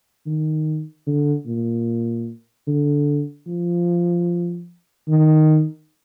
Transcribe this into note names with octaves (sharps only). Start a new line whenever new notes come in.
D#3
D3
A#2
D3
F3
D#3